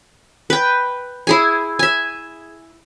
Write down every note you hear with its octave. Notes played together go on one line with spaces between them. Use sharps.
B4 G5
E4 G#4 G#5
E5 G#5